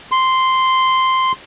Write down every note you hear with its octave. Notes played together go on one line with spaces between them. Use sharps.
C6